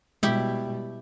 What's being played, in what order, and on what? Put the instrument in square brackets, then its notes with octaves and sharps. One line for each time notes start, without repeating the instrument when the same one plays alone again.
[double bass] B2 G3 [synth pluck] G#3 [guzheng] E4 G4